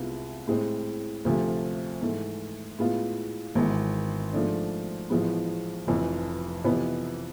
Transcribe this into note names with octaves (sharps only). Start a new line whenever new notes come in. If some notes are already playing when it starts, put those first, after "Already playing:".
Already playing: C2 C3 G#3 B3 F4
A2 G#3 C4
D2 C3 F3 A3
G#2 E3 A3
A2 G#3 B3 F4
G#1 G#2 E3
G#2 F3 A3 D4
A1 A2 F3 G#3 B3
F1 F2 E3
F2 C3 E3 B3